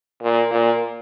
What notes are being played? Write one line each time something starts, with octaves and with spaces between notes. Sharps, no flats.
A#2
A#2